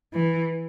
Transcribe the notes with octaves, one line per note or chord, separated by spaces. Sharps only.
E3